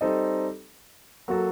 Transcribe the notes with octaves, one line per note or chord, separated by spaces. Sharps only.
G3 C4 D#4 A4 D#5
F#3 A#3 F#4 A4